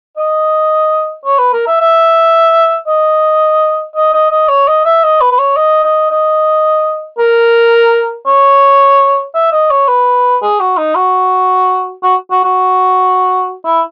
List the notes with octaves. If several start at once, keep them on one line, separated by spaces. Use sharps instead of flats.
D#5
C#5
B4
A#4
E5
E5
D#5
D#5
D#5
D#5
C#5
D#5
E5
D#5
B4
B4
C#5
D#5
D#5
D#5
A#4
C#5
E5
D#5
C#5
B4
G#4
F#4
D#4
F#4
F#4
F#4
F#4
E4